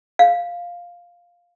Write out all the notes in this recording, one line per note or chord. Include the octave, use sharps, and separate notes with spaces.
F5